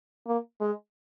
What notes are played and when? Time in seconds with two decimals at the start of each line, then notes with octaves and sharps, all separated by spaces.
0.26 A#3
0.61 G#3